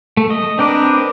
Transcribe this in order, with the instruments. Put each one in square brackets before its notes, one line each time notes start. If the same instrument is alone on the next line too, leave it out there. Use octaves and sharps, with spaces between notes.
[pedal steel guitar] A3
D#5
[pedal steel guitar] C4 A#4 B4 [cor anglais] D4